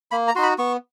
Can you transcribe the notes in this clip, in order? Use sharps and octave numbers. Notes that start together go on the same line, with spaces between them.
A#3 B5
A#5
D#4 F#4 C6
B5
B3 C#6